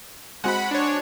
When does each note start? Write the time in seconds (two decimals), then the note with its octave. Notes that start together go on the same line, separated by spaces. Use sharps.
0.44 G#3 C4 F#4 F#5 B5
0.71 D4 C#5